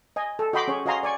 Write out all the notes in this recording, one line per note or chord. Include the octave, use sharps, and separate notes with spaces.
D#5 G#5
A4
F#4 D#5 G5 B5 C6 D6
C#4 G#4 C#5
F#4 D#5 F5 G#5 A#5 C6
D5 G#5 C#6